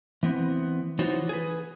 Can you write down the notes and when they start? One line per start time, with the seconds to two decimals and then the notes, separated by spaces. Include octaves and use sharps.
0.23 E3 B3 C4
0.99 E3 D#4 F4 F#4 C5 C#5
1.29 G#4 B4